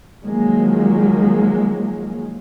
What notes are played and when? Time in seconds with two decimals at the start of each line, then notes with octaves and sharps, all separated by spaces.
0.23 D#3 F3 F#3 G#3 A#3